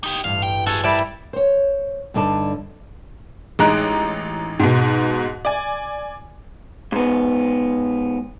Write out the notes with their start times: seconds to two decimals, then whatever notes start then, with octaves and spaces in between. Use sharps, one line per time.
0.04 D#4 G4
0.24 A1 G2 F5
0.43 G5
0.66 F#4 G#4 A4
0.84 E2 G3 E4 G4 A4 A#4 D5 A5
1.33 C5 C#5
2.14 G2 D3 D#4 D5 A5
3.59 A1 G#3 D#4 A#5 F#6 D7
4.60 G#2 B2
5.45 D5 G#5
6.92 G#2 B3